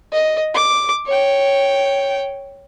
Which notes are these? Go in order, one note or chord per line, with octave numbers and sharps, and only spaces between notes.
D#5
D6
C#5 G5